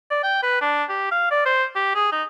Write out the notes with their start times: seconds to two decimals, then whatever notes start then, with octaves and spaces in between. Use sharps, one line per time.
0.11 D5
0.23 G5
0.43 B4
0.61 D4
0.89 G4
1.11 F5
1.31 D5
1.46 C5
1.76 G4
1.95 G#4
2.12 D#4